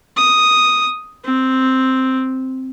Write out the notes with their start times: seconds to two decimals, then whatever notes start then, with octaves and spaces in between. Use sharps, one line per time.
0.17 D#6
1.25 C4